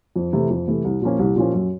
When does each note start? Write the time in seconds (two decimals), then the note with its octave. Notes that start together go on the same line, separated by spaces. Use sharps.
0.16 F2
0.33 C3 E3 A3
0.50 F2
0.67 C3 E3 A3
0.84 C2
1.02 A#2 F3 A#3 C#4
1.19 C2
1.36 A#2 F3 A#3 C#4
1.53 F#2